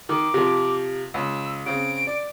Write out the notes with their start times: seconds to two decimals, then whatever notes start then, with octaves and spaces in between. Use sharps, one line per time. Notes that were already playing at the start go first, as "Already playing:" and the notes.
0.09 D#3 D6
0.34 C3 F3
1.14 C#2 E6
1.66 C#3 C4 D7
2.07 D5